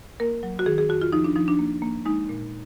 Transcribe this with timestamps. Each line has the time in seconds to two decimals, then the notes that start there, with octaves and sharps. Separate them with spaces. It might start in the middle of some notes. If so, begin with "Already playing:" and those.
0.20 A#3 A#4
0.43 F#3
0.59 F#4
0.66 D#3 G#4
0.78 G#4
0.89 F2 F#4
1.02 F4
1.12 F3 D#4
1.24 D4
1.36 F3 D#4
1.48 D4
1.59 A#3
1.82 A#3
2.06 G#3 D#4
2.29 A#2